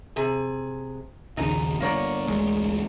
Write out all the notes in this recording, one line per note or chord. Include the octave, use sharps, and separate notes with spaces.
C3 G#4
A#1 D#2 C#3 D#4
G2 D3 A#3 C#5 D5
A1 D2 G#3